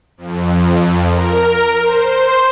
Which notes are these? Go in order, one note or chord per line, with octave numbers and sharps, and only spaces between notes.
F2
A#4
C5